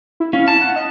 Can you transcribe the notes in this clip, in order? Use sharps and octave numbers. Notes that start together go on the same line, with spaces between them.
E4
C#4 F5
A5
F#5
D#5